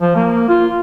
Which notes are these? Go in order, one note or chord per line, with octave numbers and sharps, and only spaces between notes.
F3
A#3
F4